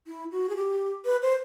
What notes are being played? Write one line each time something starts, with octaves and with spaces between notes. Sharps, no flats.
E4
F#4
G#4
G4
B4
C5